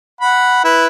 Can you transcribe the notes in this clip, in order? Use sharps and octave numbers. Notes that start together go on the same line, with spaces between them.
F#5 B5
E4 B4